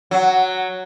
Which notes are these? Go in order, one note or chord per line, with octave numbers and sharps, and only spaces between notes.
F#3